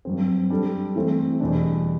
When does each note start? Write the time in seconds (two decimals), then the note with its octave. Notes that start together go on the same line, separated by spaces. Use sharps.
0.05 G2 F#3 C4
0.50 G3 D4 A4
0.96 E3 A3 C4
1.40 E2 B2 G3 D4